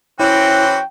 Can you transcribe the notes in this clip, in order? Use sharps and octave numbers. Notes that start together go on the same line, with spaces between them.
E3 C4 C#4 E4 F#4 G5